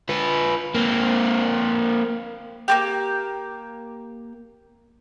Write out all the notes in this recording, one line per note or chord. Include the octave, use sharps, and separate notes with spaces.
F4 B4
A#3 C4
A#3 C4 G4